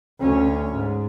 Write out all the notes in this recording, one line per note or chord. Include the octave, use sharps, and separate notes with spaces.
D2 C#4
G#2